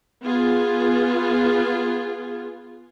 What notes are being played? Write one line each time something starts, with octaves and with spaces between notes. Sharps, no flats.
B3 F4 G#4